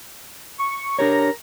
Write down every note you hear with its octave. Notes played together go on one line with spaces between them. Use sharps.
C#6
D4 G4 A#4 C#5 A#5